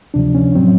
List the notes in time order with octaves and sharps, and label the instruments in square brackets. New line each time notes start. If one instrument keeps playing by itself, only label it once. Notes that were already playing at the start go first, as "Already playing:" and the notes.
[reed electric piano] D2 C3 F3 D4
C#4
A2 F#3 C4